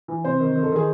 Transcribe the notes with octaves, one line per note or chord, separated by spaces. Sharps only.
E3
C3 C5
D#3
D#3
A4
D#3 G#4